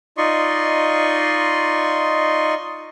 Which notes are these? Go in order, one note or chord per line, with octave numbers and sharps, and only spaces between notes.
D#4 F4 D5 D#5 C6 C#6